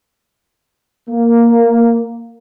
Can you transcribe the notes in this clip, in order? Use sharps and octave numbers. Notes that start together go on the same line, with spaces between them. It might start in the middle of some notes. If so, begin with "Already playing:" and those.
A#3